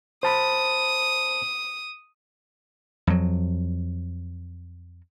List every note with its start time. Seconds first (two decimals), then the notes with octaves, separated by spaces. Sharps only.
0.23 C5 A5 B5 D#6
3.07 F2 F#3